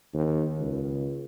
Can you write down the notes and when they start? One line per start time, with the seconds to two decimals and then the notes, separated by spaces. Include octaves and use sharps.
0.14 D#2
0.59 C#2